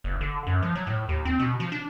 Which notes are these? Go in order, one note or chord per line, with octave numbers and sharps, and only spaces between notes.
F#1
D3
F#2
F3
F#3
A2
D#2
C4
B2
F3
D4